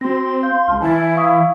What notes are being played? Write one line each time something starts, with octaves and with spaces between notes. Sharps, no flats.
C4 F#4 C6 A#6
F5 G6
C#2 A5 F6
E3 E4 G#5 A6
F5 C#6 D#6